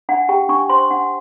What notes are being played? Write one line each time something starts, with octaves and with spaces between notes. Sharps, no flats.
D4 F#5
G4 G5
D4 C#6
C5 C6
D4 F#5